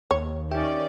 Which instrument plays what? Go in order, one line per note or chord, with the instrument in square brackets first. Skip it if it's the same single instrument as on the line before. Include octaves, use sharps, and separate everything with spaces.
[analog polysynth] D#2 [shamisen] C#5
[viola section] D#3 C#4 D5 [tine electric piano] G4 E5 G5